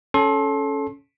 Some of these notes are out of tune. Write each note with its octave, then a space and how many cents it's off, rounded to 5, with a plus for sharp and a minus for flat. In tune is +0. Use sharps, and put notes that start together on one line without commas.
C#4 +0 A4 -15 C6 +30